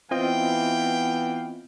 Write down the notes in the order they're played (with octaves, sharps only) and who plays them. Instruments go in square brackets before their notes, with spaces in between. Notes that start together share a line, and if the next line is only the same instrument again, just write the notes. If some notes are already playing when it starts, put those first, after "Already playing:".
[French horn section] E3 B3 [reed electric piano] C4 F4 D#5 [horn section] E4 F5 G5